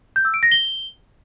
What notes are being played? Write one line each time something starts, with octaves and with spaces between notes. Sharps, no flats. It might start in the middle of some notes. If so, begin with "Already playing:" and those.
G6
E6
D7
A#6
G7